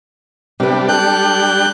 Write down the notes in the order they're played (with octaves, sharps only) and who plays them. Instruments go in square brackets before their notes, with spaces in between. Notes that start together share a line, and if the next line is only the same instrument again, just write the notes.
[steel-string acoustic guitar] C3 B4 [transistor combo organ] G3 D4
[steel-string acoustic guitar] A4 [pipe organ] F#6 G6